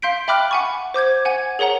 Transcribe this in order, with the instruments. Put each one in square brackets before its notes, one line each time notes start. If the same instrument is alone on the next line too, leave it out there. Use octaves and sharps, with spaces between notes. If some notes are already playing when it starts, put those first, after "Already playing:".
[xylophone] F5 C6 G6 B6 D7
E5 G5 B5 D6 F6 F#6
F#5 G#5 C#6
C5 D6 G6 G#6
F#5 G#5 G#6
G#4 A#4 C#5 F#5 A#5